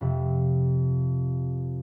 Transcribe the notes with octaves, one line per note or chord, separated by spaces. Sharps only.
F2 C3